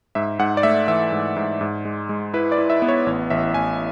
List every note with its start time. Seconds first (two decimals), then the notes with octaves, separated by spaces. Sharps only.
0.15 G#2 E5
0.39 G#2 F#5
0.57 D5
0.63 A3 E5
0.88 E3 E5
1.12 G#2
1.36 G#2
1.61 G#2
1.85 G#3
2.09 G#3
2.34 E4 B4
2.52 D5
2.58 E4
2.70 E5
2.82 B3
2.88 C#5
3.06 A1
3.30 A1 E5
3.54 A1 G#5